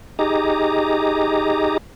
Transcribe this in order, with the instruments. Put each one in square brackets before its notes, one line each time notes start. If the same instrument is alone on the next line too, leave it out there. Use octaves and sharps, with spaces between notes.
[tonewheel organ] D#4 G4 G#4 D#5 A#5 D6